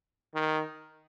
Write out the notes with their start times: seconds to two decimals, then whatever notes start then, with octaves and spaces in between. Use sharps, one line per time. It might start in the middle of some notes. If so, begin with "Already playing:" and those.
0.35 D#3